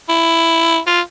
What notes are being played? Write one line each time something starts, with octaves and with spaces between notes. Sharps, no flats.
E4
F4